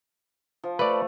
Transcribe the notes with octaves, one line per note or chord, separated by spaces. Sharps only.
F3
A3 B4 D5